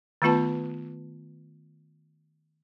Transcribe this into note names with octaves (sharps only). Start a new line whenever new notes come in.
D#3 A3 B3 F4 B4 A5